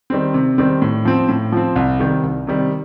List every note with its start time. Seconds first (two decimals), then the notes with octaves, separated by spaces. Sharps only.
0.10 D#3 G3 C4
0.34 C3
0.58 D#3 G3 C4
0.82 A2
1.05 F3 C4
1.29 A2
1.52 F3 C4
1.76 C2
1.99 C3 D#3 G3
2.23 C2
2.47 C3 D#3 G3